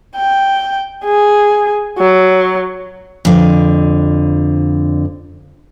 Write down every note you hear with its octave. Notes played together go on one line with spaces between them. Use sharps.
G5
G#4
F#3
F2 D3